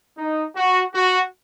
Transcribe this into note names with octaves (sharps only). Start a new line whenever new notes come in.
D#4
F#4
F#4